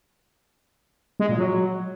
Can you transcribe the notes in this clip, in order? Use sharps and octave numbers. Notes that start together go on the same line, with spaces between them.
G#3
A#2
F#3